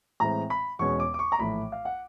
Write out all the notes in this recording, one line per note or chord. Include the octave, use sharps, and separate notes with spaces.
A2 E3 G#3 C4 A#5
B5
E2 B2 G#3 C#4 C#6
D6
D6
C#6
A#5
A#1 A2 E3 A3 B5
F5
F#5